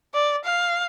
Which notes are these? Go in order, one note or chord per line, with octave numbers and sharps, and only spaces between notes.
D5
F5